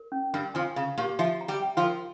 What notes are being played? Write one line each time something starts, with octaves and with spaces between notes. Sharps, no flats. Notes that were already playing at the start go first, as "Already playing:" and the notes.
Already playing: A#4
C#4
G2 G3 A#4
F2 F3 G#5
C#3 F5
A#2 A#3 G4
F3 F4 E5
A#5
G3 G4
G5
F3 F4
A#4